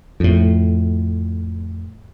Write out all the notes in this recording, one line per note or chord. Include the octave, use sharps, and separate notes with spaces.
F2 A2